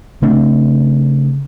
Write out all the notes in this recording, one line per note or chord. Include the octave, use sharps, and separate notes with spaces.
C#3 A3 C4 D4